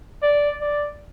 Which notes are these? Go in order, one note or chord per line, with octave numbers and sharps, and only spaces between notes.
D5
D5